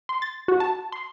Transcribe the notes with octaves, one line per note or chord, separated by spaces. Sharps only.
C6
A6
F#4
A5
C6